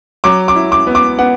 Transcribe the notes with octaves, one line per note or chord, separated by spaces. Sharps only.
F#3 D6
D6
E4
D6
B3
D6
B3 F#5